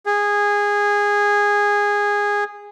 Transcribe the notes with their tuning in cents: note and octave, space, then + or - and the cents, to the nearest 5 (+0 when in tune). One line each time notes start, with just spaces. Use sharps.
G#4 -15